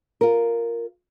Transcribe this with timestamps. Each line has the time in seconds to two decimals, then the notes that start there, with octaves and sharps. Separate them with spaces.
0.21 F4 A#4